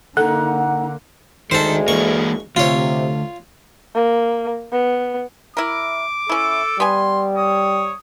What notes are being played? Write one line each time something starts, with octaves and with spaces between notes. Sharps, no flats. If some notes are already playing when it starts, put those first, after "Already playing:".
D3 A#3 D#4 A4 F#5
D2 D#3 G#3 A4 C5
E3 A#3 C#6
D2 C3 F4 C#5
A#3
B3
E4 A#4 D6
C#4 E4 A4
G3 B3 G#5 C6
C#5 D#6